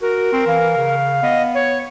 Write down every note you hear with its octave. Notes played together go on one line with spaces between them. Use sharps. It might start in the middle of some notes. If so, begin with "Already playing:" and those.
F#4 A#4
C4
E3 F5
C#3
B3 D#5
C#5